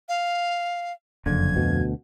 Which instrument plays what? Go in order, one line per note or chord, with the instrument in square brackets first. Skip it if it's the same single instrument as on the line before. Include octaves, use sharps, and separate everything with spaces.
[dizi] F5
[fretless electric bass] F#1 D3 [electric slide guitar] F2 [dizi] G#6
[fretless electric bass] D2 B2